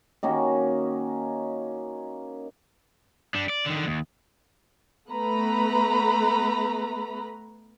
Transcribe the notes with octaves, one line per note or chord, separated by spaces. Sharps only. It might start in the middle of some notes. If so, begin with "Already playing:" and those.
D#3 A#3 C#4 F#4
G3 D4
D5
D3 D#3
D#2
A3 B3 B4 A#5 B5